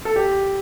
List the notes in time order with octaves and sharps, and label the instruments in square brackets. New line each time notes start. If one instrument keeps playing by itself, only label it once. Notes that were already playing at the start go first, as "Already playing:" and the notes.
[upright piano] A4
G4